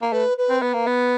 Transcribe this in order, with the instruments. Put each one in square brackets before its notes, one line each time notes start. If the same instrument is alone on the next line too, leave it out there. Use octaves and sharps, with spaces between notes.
[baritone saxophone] A#3
[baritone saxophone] A3 [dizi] B4
[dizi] B4
[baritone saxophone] C4
[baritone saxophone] B3 [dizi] B4
[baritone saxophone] A#3
B3